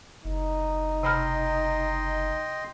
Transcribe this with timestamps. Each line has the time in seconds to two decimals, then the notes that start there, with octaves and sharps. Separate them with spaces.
0.24 F#1 D#4
1.03 C3 D#5 G5 B5 C6 F6